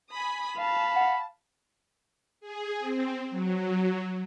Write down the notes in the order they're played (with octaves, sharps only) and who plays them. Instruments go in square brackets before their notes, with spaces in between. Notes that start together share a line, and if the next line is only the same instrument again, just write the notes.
[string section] G#5 B5 D#6
[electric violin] F5 [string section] A5 [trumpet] B5
[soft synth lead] F#5
[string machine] G#4
C4
F#3